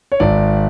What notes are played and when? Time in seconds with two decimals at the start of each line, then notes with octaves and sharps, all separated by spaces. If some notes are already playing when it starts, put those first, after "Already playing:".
0.12 C#5
0.20 G#1 D5